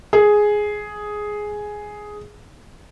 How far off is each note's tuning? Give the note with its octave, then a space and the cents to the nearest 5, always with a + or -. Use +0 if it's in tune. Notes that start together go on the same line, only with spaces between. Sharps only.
G#4 +5